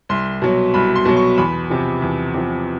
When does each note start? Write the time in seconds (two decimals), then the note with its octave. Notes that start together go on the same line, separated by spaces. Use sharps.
0.09 C2 C6
0.42 B2 F#3
0.74 C2 B5
0.95 C6
1.05 B2 F#3
1.17 C#6
1.38 E2 B5
1.70 C3 F3
2.02 E2
2.34 C3 F3